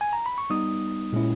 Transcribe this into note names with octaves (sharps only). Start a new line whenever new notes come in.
G#5
A#5
B5
C#6
G3 B3 D#4 D#6
A#2 G#3 C#4 E4